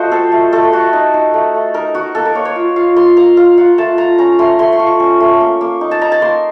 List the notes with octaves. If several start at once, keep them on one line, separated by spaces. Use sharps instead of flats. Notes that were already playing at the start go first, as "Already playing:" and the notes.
Already playing: A3 F4 F#4 C5 D#5
C4 A4
A3
A3 A4
A3 F#4
D#4
D#4
A3
A3
D#4 A#4
D#4 F#4
A#3 A4
A#4
A#3 C#5
C#5
F4
F4 F5
A#3 C6
A#3 A#5
F4 F5
F4 F#5
A3 A5
F4 A#5
C#4 A#5
A3 C6
A3 C6
C#6
F4
C#6
C#4
A3
A#3
A#3
D#4
A5
D#4 A#5
A5
A#3 C6